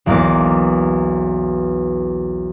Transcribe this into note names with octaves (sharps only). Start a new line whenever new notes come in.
B1 E2 A#3 A#4 D6